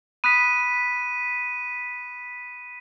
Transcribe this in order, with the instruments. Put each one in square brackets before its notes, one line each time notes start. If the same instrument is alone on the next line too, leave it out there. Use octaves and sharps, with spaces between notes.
[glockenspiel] B5 D#6 F#6 [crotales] B6 D#7